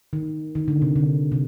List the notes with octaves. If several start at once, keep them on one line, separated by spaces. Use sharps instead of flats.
D#3
D#3
D3
C3
D3
C3